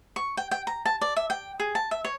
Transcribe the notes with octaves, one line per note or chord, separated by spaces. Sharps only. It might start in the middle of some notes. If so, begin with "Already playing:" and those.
C#6
G5
G5
A#5
A5
D5
E5
G5
G#4
A5
E5
C#5